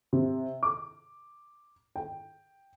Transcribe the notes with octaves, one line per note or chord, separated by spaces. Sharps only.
C3
D6
G5